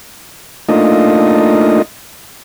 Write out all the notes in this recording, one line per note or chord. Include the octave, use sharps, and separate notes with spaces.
A3 A#3 D4 D#4 F4 D#5